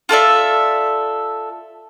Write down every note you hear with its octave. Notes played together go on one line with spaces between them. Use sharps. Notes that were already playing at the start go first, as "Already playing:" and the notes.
F4 A4 D5 E5